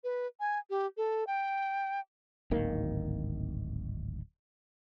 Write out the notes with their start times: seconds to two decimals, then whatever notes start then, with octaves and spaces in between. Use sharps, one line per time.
0.04 B4
0.40 G#5
0.70 G4
0.97 A4
1.27 G5
2.51 D1 G#1 D#3 A#3